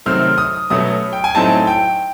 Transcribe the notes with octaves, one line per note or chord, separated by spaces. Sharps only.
C3 D#3 F#3 A3 C4 F6
D#6
B2 F#3 A3 C#4 D#6
G5
G#5
A2 F#3 A3 C4 D#4 A5
G5